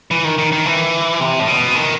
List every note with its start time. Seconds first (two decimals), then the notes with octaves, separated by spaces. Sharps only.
0.11 E3
0.24 D#3
0.38 D#3
0.52 D#3
0.66 E3
1.20 C3
1.40 A2
1.47 B2
1.75 D#3